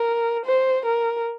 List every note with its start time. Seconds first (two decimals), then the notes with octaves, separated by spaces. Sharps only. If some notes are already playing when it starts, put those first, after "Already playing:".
Already playing: A#4
0.45 C5
0.85 A#4